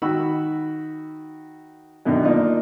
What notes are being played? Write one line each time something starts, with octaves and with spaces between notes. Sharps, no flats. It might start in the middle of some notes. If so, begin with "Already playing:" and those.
D#3 F#4 B5 E6
F#2 B2 D3 D#3
A#3 D4 D#4 F4